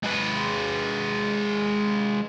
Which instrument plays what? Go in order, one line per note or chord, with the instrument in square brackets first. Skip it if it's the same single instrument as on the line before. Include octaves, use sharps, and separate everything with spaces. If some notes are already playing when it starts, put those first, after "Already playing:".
[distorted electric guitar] G#3 B4